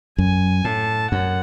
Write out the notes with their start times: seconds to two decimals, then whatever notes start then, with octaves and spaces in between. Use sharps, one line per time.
0.18 F#2 G#5
0.64 A2 A5
1.12 F#2 F#5